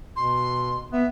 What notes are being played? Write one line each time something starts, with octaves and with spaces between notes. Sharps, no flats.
B2 C6
B3 E5